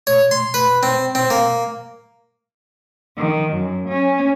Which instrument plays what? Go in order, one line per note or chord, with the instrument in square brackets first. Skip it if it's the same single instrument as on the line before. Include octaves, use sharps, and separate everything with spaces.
[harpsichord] C#5
C6
B4
C4
C4
A#3
[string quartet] D#3
F#2
C#4